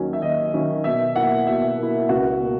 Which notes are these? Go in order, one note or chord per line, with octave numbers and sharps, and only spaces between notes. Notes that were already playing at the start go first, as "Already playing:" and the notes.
Already playing: D#2 D#3 F#3 C#4
E5
D#2 D#5
D#3 F#3 C#4
B2 E5
A#3 E4 F#5
B2 E5
A#3 E4
C#2 F#4
B2 A#3